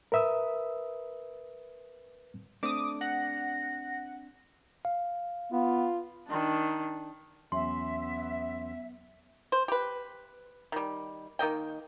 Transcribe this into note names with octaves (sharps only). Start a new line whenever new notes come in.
A#4 B4 E5 D#6 E6
A3 C4 D4 D6 D#6
F#5 A#6
F5
B3 F4
D#3 D4
E2 F#3 B3 C#4 E5 C6
C5
G4 B4
D#3 G3
D#3 A#3 D#5 G5